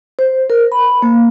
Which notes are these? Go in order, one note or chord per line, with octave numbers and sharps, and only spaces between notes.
C5
A#4
B5
A#3